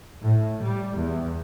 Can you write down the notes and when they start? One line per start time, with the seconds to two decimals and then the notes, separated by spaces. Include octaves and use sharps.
0.22 A2
0.63 G3
0.97 E2